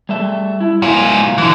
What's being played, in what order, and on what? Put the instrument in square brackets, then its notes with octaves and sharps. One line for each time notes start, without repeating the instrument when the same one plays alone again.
[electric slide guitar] G3 A3 E5
E4
[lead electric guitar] G#2 F4 [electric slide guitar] F#3 E4 F5
[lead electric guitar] D3 E3